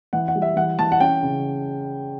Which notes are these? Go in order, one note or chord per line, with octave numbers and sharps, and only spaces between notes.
E3 F#5
F#5
G3
E5
E3 F#5
E3 A5
F#5
C#4 G5
C#3